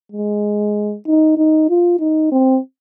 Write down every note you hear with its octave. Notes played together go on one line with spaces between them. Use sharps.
G#3
D#4
D#4
F4
D#4
C4